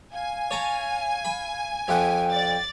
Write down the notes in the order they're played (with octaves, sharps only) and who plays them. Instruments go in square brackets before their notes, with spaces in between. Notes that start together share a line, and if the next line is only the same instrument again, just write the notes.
[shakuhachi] F5 [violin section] G#5
[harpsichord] C#5 A5 A#5
B5
[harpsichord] F2 F#5 [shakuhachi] G5
[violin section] D5 A6